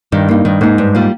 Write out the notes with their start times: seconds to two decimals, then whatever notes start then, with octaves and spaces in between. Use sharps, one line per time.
0.12 G2 D#3
0.29 A#3 D#4
0.45 G2 D#3
0.61 G#2 A#3 D#4
0.78 G2
0.95 G3 A#3 F4